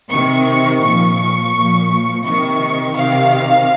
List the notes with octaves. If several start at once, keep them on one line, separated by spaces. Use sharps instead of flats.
C3 D#3 C#6
C#6
A#2 F3 C#6
A#2 F3
C3 D#3 C#6
C3 D#3 F5